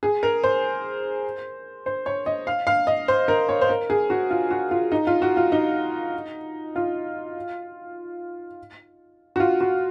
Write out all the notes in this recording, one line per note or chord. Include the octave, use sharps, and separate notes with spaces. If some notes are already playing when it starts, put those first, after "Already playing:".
G#4
A#4
C5
C5
C#5
D#5
F5
F5
D#5
C5
A#4
C#5
C5
A#4
G#4
F#4
F4
F#4
F4
D#4
F4
F#4
F4
D#4
F4
F#4
F4
F#4